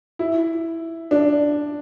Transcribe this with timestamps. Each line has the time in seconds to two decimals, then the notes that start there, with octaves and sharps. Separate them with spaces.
0.19 E4
1.11 D4